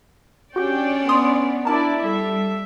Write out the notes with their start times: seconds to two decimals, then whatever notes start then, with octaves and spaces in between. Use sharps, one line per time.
0.56 C#4 D4 F#4 G4 C#5 D5 G5
1.09 B3 C6 D#6
1.65 D4 E4 A#4 D5 A5
2.04 G3 A4 E5